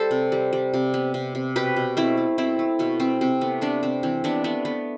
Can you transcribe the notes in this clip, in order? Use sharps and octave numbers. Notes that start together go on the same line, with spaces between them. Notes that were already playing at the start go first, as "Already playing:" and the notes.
Already playing: G3 A4 C5
C3
G3
G3
C3
B3
C3
C3
B2 G4 B4
B2
A3 C4 E4
A3
B2 C4 E4
A3
B2 B3
B2 C4
C3 C4
A3 B3
C3 B3 D4
C3 C4
E3 C4
C3 B3 D4
A3 B3 D4
A3 B3